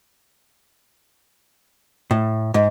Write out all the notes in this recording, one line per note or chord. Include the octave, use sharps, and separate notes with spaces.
A2
G#2